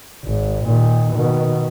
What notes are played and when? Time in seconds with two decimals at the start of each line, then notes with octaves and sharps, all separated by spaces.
0.24 G#1
0.66 A#2 D#3
1.14 B2 D#3